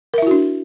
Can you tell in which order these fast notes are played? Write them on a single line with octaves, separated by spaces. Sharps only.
A#4 E5 E4 F#4 D4